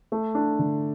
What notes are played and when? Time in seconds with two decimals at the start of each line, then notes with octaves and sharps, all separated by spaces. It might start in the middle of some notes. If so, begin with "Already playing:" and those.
0.12 A3
0.35 D4
0.59 D3